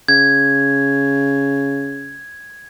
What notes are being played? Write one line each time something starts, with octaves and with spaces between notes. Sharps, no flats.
C#3 G#6